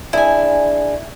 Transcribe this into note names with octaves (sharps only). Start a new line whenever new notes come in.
D4 E4 G#4 G#5